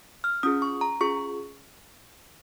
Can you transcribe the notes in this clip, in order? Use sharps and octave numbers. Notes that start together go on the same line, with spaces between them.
F6
C#4 F4 G#4 D#6
C#6
A#5
C#4 F4 G#4 C#6